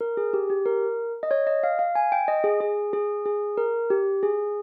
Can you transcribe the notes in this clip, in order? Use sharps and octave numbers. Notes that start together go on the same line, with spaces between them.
A#4
G#4
G4
G4
A#4
D#5
C#5
D#5
F5
F5
G#5
G5
D#5
G#4
G#4
G#4
G#4
A#4
G4
G#4